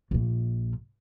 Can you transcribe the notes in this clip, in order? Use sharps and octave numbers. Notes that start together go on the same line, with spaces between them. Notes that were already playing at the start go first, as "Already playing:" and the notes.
A#1 A#2